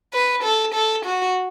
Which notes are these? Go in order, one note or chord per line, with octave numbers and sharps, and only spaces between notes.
B4
A4
A4
F#4